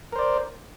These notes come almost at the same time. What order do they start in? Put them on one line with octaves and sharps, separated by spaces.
A#4 C5 D5